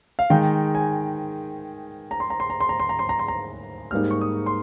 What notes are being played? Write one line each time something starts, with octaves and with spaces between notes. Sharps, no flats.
F5
D#3 G#3 D#4 G5
G#5
A#5
C6
A#5
C6
A#5
C6
A#5
C6
A#5
C6
A#5
C6
A#5
G#2 G3 A#3 D#4 F6
C#6
D#6
C6